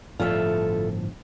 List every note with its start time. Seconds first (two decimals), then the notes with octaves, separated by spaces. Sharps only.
0.20 G1 A2 F3 F4 A4 E5